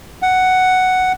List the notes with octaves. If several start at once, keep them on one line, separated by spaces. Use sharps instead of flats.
F#5